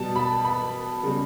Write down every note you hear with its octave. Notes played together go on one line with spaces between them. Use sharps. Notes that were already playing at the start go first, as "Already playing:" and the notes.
Already playing: B2 G3 A5
B5
B5
C#3 G3